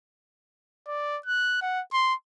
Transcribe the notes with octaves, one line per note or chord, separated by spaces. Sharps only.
D5
F#6
F#5
C6